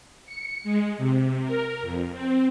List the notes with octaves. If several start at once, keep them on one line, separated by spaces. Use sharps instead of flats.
C#7
G#3
C3
A#4
F2
C4